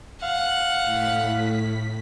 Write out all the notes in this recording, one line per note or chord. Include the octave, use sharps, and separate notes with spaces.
F5 F#5
A2 B6